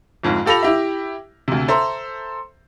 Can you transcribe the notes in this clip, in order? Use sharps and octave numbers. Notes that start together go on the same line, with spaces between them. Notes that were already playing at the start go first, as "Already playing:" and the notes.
G1 F2 G#2
F4 G4 A4 B5 A#6 F7
E4 G4 E5
D2 C3
A4 C5 E5 A#5